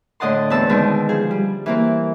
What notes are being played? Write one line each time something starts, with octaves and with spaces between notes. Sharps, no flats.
A2 D3 D#5 F#5 A5 C6
E2 B3 C4 A5 E6
B2 D3 D#3 G#3 C4
F3 G#4
G3
E3 A#3 C4